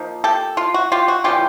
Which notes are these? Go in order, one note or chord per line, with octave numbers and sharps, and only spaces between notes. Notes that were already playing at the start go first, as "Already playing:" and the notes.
Already playing: F3 A#3 D#4
G4 A4
F4
F#4
F4 G4
F#4
C#3 E3 G3 F4 G4